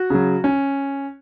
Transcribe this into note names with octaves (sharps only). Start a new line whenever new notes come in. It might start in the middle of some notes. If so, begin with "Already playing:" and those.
Already playing: F#4
C#3 F#3
C#4